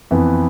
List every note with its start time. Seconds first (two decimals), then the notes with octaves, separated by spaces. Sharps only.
0.11 F2 E3 B3